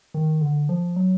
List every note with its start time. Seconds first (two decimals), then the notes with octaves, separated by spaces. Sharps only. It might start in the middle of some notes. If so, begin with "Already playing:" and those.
0.14 D#3
0.41 D3
0.69 F3
0.96 F#3